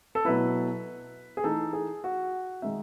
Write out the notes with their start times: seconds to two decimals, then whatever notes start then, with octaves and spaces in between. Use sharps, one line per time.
0.15 A4
0.25 B2 F#3 A3 E4 B4
1.37 G#4
1.44 E3 A3 D#4 A4
1.73 G#4
2.04 F#4
2.62 D#3 G#3 D#4 E5